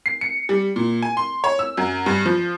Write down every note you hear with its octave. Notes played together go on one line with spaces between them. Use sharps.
C7
C#7
G3
A#2
G#5
C6
C#5
E6
F#2
G2
F3